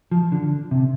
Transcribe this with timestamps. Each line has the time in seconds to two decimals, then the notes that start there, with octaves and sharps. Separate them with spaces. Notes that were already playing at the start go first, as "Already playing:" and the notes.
0.11 F3
0.32 D3
0.71 C3